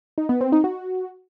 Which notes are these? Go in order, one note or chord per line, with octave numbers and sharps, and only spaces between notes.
D#4
B3
C4
D#4
F#4